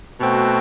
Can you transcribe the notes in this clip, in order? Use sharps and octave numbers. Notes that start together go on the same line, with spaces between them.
B2 A3 C4 F#4